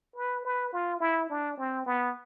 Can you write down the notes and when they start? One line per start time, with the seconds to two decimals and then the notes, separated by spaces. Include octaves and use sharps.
0.16 B4
0.44 B4
0.72 F4
1.00 E4
1.30 D4
1.57 C4
1.86 B3